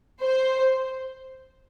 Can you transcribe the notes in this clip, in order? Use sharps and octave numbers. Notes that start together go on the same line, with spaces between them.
C5